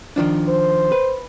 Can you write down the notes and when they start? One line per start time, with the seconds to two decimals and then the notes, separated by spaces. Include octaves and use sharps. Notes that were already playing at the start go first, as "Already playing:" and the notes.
0.16 D#3 F3 D4
0.48 C5
0.92 B4